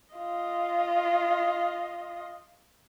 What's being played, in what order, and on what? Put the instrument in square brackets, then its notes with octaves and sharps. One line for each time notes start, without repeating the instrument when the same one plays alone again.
[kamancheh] F4 D#5